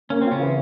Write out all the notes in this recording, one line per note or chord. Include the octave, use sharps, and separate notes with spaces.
A#3 C#4
C4 F4
C#3 C#4
E3